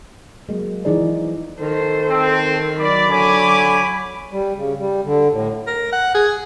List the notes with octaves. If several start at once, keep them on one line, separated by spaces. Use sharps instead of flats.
F#3 G#3 A#3
E3 F3 D#4 G#4 D5
D#3 A4 C5
C4
F#3 D5 B5
D3 C#5 G#5 D6
G3
C#3
G3
D3
A2
A#4
F#5
G#4